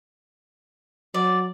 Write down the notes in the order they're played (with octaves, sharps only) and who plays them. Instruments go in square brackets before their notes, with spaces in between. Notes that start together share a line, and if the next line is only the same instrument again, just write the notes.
[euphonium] F#3 [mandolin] D5